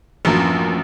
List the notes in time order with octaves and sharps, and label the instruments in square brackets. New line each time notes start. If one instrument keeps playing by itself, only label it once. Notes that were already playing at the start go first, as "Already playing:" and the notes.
[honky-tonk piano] A1 F#2 [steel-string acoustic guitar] F3 A#3 D4